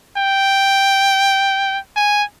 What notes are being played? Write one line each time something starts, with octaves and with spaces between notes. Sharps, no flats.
G5
G#5